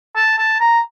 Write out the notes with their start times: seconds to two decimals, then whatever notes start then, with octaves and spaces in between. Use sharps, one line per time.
0.16 A5
0.38 A5
0.60 A#5